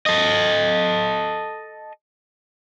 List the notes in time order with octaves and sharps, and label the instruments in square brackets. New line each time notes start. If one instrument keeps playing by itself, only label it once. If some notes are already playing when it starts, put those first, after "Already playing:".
[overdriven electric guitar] A4 D#5